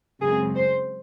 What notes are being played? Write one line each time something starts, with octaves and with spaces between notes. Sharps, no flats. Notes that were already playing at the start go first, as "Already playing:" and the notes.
F#2 C#3 G#3 C4 G#4
C5